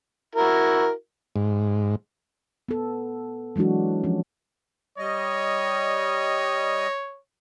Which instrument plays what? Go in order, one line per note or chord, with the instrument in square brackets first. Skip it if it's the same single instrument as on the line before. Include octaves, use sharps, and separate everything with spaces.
[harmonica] E4 F#4 A#4
[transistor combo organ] G#2
[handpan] B3 A4
E3 F#3 G#3 D4 F#4
F3 C#4
[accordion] G3 D#5 [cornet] C#5